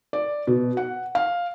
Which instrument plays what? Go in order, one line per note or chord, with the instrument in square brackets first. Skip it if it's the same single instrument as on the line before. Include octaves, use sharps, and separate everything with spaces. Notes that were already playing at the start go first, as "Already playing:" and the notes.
[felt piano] D5
B2
F#5
F5